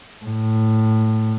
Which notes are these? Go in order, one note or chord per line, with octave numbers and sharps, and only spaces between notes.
A2